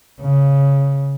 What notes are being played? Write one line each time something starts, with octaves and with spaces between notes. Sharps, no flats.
C#3